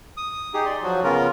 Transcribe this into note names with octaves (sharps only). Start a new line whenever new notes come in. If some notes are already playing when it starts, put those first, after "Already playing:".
D#6
D#4 G4 G#4
D5 C6
F3 F#3 F#4
C#3 B3 C#4 F4 A#4